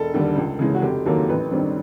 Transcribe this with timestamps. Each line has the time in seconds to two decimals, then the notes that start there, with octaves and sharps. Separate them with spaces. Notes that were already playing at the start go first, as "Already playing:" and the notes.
Already playing: E1 A4
0.14 D#2 D3 G3
0.36 C#2
0.59 C#3 E3 G#3
0.75 F#4
0.82 F1 G4
1.06 D#2 D#3 F#3 A#3 A4
1.29 A1 B4
1.51 G2 D#3 G3 C4